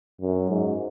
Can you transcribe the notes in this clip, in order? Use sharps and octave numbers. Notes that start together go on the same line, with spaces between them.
F#2
G#2